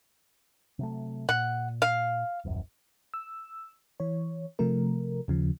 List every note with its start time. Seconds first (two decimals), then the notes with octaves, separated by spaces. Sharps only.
0.79 C3 F#3 A3
1.29 A#2 F#5
1.82 F5
2.45 D#1 A1 F#2
3.14 E6
4.00 E3 C#5
4.59 C3 F3 A3 A#4
5.28 D#2 C#3 F3